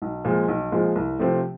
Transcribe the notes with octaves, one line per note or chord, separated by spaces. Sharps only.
B1
A#2 F3 G#3
B1
A#2 F3 G#3
C2
C3 F3 A3 C4